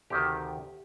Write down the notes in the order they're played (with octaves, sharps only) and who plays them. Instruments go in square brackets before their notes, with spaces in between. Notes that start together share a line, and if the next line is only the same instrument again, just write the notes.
[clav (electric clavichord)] D2 C3 D#3 G4